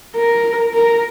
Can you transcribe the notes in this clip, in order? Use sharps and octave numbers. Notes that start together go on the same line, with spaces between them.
A#4
A#4